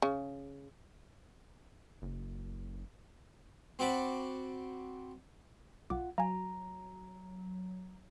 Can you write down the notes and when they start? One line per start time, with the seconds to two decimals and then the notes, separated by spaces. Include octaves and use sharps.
0.02 C#3
2.02 F#1
3.79 C4 F#4 D5 B5
5.90 B1 F4 F#5 D6
6.18 F#3 F5 G#5 A#5